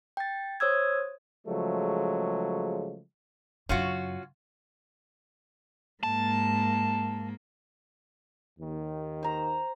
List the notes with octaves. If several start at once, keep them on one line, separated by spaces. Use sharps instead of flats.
G5 A6
C5 C#5 D#6 E6 G#6
C#3 F3 F#3 G#3 A3
F#2 C#3 C#4 F4 F#4
G#2 A#3 A5
D#2 D#3
C5 A#5